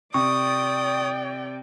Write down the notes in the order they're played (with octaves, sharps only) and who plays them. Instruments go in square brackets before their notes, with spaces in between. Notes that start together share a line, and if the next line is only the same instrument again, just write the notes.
[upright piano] C3 [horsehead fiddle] D5 G5 [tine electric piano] C#6 [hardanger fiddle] D#6